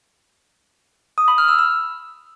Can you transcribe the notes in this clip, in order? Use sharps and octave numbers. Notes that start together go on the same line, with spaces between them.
D#6
B5
F6
E6
E6